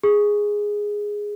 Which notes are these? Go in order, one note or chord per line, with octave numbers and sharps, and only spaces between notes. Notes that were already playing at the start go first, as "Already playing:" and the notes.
G#4